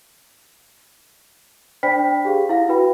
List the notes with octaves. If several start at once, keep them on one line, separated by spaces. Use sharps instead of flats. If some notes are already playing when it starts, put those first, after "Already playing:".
D4 C5 D5 G5 B5 B6
G4 G#4 F5
E4 F5 F#5 A#6
F#4 B4 G5 B5